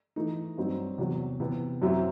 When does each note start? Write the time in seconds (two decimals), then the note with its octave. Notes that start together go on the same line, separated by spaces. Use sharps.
0.16 E3 A3 D#4
0.58 G2 F#3 C4 D#4
0.98 E2 C3 F#3
1.40 C3 E3 B3
1.82 F#2 F#3 C4 E4 G4